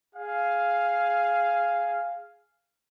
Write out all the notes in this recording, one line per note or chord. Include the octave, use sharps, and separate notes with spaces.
G#4 F5